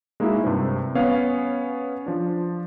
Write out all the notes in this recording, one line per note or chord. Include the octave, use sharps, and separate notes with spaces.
G#3 A#3 D#4 E4 F#4 E5
G2 C3 C5
B3 C#4 C#5 F5
F3 D4